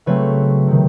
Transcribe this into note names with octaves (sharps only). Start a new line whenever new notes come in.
C#3 F#3 A3 C4 B4 C#5
C3 D#3